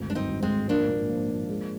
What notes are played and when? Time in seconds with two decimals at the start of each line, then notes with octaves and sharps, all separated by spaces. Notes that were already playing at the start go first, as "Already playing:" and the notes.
Already playing: G#1 D2
0.09 G2 D4
0.15 C4 D#4
0.29 G#1
0.43 G#3 C4
0.49 G#1
0.69 F3 A#3 D4
0.88 A#2
1.09 F3
1.29 F3
1.49 G#3